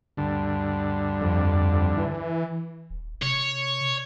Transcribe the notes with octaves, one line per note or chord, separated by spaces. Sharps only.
D2 G2 D3
F2
E3
D#1
C3 C#5